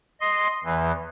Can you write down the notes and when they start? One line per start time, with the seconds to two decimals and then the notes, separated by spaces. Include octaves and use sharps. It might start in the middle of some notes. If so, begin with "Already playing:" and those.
0.21 D#5 C6
0.64 E2 E3